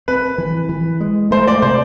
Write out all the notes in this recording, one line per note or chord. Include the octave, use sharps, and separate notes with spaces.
C4 B4
E3
E3
G#3
A3 C5
D5
C3 C5